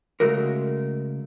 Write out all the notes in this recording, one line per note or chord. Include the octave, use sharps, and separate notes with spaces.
C#3 E3 G#3 A3 F#4 A#4